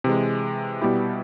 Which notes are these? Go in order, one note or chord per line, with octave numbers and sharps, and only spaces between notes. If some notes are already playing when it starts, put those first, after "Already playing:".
C3 E3 G#3
B2 G3 B3 E4 G4